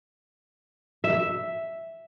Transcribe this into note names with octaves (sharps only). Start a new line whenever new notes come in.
E5